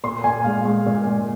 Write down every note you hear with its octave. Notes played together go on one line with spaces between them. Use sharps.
A#2 C6
A#2 G#5
G#3 F5
G#3
A#2
G#3